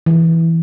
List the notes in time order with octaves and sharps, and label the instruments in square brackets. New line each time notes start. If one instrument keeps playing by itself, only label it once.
[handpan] E3